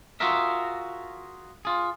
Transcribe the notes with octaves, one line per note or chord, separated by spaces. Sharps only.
F4 F#4 G#4 A#4 E5
F4 G#4